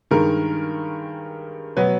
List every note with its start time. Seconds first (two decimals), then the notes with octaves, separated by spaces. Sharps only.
0.11 G2 D#3 G#3 A#4
1.77 B2 F#3 B3 B4